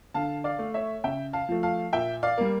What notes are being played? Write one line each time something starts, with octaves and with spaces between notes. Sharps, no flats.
D3 F5 A5
D5 F5
A3
C#5 E5
C#3 E5 G5
F5 A5
F3 A3
F5 A5
A#2 E5 G5
D5 F5
G3 A#3